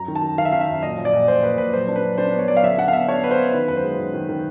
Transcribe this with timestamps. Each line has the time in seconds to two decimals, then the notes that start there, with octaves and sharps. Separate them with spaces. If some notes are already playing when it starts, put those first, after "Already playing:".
Already playing: F#2 A#5
0.08 D#3
0.15 A5
0.22 D#3
0.38 D#3 F5
0.45 E5
0.52 D#3 F5
0.61 E5
0.68 F#2
0.83 A#2 D#5
0.97 F3
1.05 D5
1.13 A#2
1.28 A#2 C5
1.43 A#2 B4
1.58 A#2 B4
1.73 F#3 C5
1.88 D4
1.96 B4
2.03 F#3
2.18 D4 C5
2.33 B3
2.39 C#5
2.48 F#3 D5
2.57 F5
2.63 D3 E5
2.78 D4 F#5
2.88 F5
2.93 B3 E5
3.08 D4 C#5
3.23 B3 B4
3.31 C5
3.38 B3
3.53 D#3 B4
3.68 F#2 B4
3.76 C5
3.84 G#3
3.99 D#3
4.14 D#3
4.29 D#3